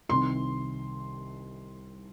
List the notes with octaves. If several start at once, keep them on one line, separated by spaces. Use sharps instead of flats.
C2 C3 D#3 C6